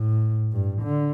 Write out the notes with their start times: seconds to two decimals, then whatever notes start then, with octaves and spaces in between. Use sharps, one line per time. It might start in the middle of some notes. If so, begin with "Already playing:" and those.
Already playing: A2
0.52 G2
0.82 D3